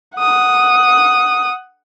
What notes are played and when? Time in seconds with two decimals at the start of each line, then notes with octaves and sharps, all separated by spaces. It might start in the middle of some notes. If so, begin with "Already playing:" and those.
0.18 F#5 D#6